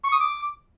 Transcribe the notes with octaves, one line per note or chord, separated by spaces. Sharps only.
C#6
D#6
D6